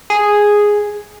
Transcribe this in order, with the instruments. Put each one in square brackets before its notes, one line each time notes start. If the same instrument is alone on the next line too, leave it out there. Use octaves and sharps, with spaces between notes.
[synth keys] G#4